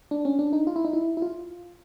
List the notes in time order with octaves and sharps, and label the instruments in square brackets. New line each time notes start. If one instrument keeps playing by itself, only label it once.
[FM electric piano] D4
C#4
D4
D#4
F4
E4
D#4
E4
E4
F4